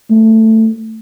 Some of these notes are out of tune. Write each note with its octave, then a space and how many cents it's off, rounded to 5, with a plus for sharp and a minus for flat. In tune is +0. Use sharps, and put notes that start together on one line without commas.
A3 +10